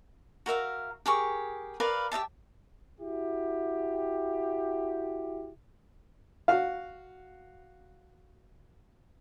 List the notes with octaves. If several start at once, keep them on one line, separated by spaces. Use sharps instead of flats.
F#4 A#4 E5 F5
G4 G#4 A#4 C#6
A#4 B4 D5 F5
G4 D#5 E5 A5
E4 F#4 G4
F#4 F5